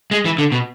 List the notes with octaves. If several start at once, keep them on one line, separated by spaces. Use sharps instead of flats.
G#3
E3
D3
B2